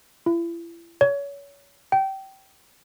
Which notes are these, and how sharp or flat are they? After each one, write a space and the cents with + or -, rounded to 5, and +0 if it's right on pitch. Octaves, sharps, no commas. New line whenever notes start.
E4 +40
C#5 +30
G5 -20